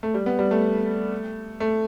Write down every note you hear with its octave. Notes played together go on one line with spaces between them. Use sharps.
A3
G3
B3
G3
A3
A3